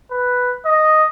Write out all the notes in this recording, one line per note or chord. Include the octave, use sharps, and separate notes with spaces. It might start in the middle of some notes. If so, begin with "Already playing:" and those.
B4
D#5